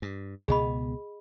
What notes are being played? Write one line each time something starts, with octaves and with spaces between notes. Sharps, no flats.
G2
C#2 B2 B3 G#4 D#5 B5